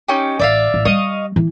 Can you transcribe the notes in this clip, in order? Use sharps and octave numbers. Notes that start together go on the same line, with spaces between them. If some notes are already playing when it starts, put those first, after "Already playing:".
C#4 D#4 G4
A1 D5 E5 F5
A1
G3 D#5 F5 C#6
E3